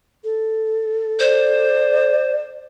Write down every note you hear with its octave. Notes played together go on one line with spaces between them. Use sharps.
A4
C5 D5